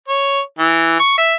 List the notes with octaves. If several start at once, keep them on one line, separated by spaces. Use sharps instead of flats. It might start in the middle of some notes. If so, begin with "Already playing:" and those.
C#5
E3
C#6
E5